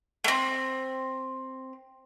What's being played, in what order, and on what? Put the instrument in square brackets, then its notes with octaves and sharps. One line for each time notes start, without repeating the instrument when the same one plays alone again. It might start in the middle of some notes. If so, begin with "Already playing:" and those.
[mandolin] A3 C4